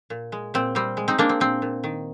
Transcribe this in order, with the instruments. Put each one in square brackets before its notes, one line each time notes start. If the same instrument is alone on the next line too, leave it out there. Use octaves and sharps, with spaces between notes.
[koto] A#2
G#3
A#2 C4
G3 C4
G#3
C4 D#4
G#3 A#3 D4
C4
A#2 C4
A#2
D#3